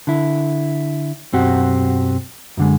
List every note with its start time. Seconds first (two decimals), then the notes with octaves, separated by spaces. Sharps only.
0.07 D3 E4
1.33 B1 F#2 C4 F#4 G4 F#5
2.57 F#2 D3 G#3